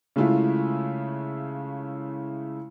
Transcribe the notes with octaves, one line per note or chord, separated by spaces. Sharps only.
C#3 G#3 A3 E4 F4